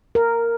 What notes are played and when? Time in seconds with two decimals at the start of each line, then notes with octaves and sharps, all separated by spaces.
0.15 A#4